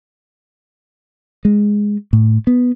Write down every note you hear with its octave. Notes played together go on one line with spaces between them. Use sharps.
G#3
A2
B3